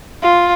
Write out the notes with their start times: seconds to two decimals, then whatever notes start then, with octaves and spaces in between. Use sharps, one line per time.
0.23 F4